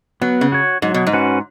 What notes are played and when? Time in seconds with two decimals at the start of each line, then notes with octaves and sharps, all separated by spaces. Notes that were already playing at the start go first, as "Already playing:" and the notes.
0.21 F#3 B3
0.41 C#3
0.52 F#4 C#5
0.82 G#2 F#3
0.94 B2
1.07 G#2
1.13 C#4 F#4 B4